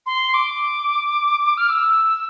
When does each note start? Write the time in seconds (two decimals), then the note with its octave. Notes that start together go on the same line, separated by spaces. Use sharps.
0.06 C6
0.34 D6
1.57 F6
1.69 E6